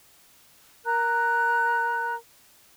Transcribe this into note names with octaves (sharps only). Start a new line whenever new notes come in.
A#4 A#5 F#6